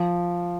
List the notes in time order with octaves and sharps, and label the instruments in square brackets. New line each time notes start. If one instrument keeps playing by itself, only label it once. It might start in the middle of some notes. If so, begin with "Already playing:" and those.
Already playing: [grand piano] F3